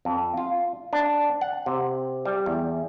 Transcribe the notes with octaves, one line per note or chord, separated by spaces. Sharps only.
F2
F4
D4
F#5
C3
G3
E2